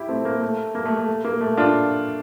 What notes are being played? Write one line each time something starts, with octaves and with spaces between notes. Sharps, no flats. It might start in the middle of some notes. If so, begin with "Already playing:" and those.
Already playing: E4 G4
A3 C4
A#3
A3
A#3
A3
A3
A#3
A3
D4 F4